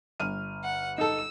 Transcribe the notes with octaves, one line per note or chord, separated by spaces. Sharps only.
G1 F6 D#7
F#5
D#4 A4 E6